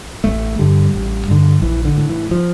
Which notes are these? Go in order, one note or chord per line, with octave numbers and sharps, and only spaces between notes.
A1 A3
G2 D3 G3
A1
G2 D3
A#1 E3
D3
A2
E3
F3